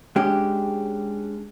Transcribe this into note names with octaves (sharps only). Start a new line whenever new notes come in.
G#3 C#4 D4 G4